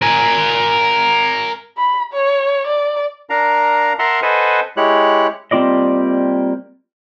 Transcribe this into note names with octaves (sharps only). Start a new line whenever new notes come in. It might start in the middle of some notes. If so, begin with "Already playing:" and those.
A#4 G#5
B5
C#5
D5
D4 A#4 F5 A#5
A#4 E5 F#5 A5 A#5 C6
A4 B4 C5 D#5 F#5 G#5
G#3 E4 G4 C#5 F#6
G3 A#3 C4 F4 D5 D#5